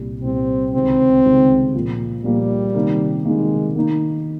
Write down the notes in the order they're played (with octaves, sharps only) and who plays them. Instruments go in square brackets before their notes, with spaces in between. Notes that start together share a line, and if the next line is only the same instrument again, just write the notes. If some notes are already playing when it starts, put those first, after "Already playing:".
Already playing: [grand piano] C2 A#2 G3
[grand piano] C2 A#2 G3 [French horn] C4
[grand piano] C#2 C3 D#3 G3 [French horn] C4
[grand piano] C#2 C3 D#3 G3
A#2 F3 A#3 F4
[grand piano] A#2 F3 A#3 F4 [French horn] G3
[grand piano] C3 D#3 A#3
[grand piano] C3 D#3 A#3 [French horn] G#3
[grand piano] D#3 A#3 D#4